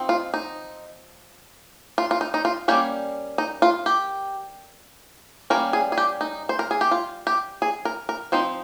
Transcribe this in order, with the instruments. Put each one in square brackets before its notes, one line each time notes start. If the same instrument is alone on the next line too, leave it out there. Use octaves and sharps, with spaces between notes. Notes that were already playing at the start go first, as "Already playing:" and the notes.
Already playing: [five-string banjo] F3 C4 D#4
F4
D#4
F4
F4
D#4
D#4
F4
G3 A#3 C#4 G4
D#4
F4
G4
G3 A#3 C#4 A#4
G#4
G#4
G4
D#4
C5
A#4
G#4
G4
F4
G4
G#4
A#4
A#4
F3 C4 D#4 C5